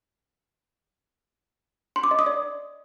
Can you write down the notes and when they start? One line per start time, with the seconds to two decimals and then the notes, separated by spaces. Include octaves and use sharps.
1.96 C6
2.04 D6
2.11 D#5
2.19 D#6
2.26 D5